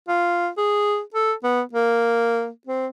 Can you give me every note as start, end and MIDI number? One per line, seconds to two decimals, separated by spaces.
0.08 0.48 65
0.57 1.00 68
1.14 1.32 69
1.43 1.61 59
1.73 2.49 58
2.67 2.87 60